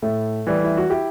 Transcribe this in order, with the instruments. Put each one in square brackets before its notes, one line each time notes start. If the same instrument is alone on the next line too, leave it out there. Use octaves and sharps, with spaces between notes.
[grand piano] A2 A3
E3 G3
E4
F#4
E4 G4